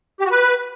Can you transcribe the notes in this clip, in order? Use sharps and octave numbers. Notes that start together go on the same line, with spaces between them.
G4
F#4
B4